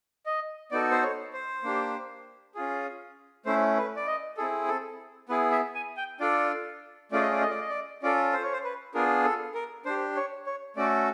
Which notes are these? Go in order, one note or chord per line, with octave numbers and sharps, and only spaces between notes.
D#5
B3 D#4 F#4 A4 D5
C5
C#5
C5
A#3 D4 G4
C#4 F4 G#4
A3 C#4 E4 C5
B4
D5
D#5
C4 E4 G#4 A4
A4
B3 E4 G#4 B4
E5
G#5
G5
D4 F4 A4 D5
A3 C#4 F4 G#4 D5
D#5
D5
D#5
D5
D#5
D5
C#4 F4 A4 D5
C5
C#5
C5
B4
B3 D4 F4 G#4 A#4
A4
A#4
D4 G4 C5
C#5
C#5
A3 C#4 F#4 A4 D5